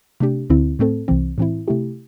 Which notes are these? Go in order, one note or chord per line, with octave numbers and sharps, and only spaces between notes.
C3 A3 D4 G4
D2 D3 C4 E4
A2 A3 C4 A4
C2 C3 E3 C4
A2 E3 C4 E4
C3 A3 E4 G4